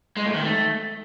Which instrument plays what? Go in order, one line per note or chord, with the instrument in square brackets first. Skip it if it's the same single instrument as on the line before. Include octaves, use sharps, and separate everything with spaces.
[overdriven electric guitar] G#3
A2
D#3
A3